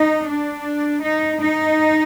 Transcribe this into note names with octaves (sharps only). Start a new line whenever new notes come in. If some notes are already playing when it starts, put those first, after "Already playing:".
Already playing: D#4
D4
D#4
D#4